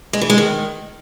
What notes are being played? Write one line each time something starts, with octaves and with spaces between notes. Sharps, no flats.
G#3
E3
G#3
D#3